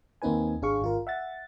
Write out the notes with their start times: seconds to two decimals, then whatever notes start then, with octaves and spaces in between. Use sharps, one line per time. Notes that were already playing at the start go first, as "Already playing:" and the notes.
0.22 D#2 A#3 C4 D#4 B4 G#5
0.62 G#1 D4 G#4 F5 C#6
0.82 G#1 F4 A#4
1.07 E5 F#5 A6